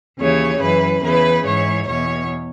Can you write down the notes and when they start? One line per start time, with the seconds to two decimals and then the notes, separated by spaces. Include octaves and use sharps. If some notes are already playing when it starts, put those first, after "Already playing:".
0.19 D#2 C#3 E3 C#5
0.61 F#2 E3 B4
1.03 E2 C#3 E3 B4
1.45 G#2 E3 C#5
1.86 E2 B2 C#5